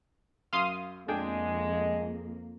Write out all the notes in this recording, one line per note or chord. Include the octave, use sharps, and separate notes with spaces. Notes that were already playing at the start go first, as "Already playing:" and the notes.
F#2 F5 C6 D#6
F2 G#3 A#3 D4 G#4 G5